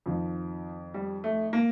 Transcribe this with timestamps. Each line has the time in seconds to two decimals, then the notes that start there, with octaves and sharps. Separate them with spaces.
0.06 F2 D#3 F3
0.94 G3
1.24 A3
1.53 A#3